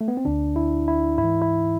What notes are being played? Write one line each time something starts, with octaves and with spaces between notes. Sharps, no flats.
A3
B3
C4
D2 D3 D4
E4
E4
G#2 E4
E3
E4